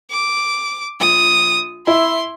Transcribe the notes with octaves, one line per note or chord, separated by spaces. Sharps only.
D6
A#1 D#6
E4 E5 C6